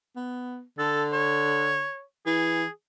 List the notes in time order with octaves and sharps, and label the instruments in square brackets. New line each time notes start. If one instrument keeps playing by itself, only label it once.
[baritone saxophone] B3
[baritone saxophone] D3 [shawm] A4
[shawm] C#5
[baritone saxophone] E3 [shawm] G#4